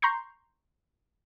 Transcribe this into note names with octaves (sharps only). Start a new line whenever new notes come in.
A#5 C6 C#6 G6 C7